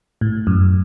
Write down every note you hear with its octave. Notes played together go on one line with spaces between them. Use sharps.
A2
F#2